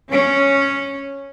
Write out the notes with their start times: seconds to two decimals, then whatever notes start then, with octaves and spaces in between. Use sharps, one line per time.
0.10 C#4